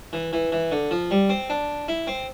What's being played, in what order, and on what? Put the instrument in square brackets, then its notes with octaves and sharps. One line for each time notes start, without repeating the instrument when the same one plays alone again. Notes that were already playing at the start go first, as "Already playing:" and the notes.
[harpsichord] E3
E3
E3
D3
F3
G3
C4
D4
E4
C4